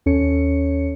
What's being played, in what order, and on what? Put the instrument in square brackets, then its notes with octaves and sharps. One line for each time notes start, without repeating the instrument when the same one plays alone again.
[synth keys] D#2 C#4 A4 C#5 C#7